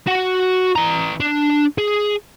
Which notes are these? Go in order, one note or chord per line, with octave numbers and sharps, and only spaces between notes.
F#4 F#5
E3 A#5
D4
G#4